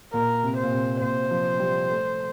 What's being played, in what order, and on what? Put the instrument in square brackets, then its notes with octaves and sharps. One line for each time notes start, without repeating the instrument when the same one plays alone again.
[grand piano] A#2 [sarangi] A#4
[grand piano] C3
[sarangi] C5
[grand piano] A#2
C3
[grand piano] A#2 [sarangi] C5
[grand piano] F3
G3
A3